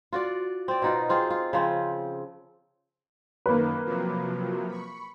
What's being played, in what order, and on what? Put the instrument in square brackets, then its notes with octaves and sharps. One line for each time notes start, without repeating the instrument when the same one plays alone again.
[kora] F4 F#4 D5
C4 D5
B2 D#4 F4
C4 F4 G#4
F4
C#3 F3 C4
[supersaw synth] F#2 D#3 [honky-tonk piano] A#3 B4
[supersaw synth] C3 F3 F#3
B5 C#6